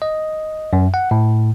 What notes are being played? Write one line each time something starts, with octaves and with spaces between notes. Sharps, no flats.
D#5
F#2
F#5
A2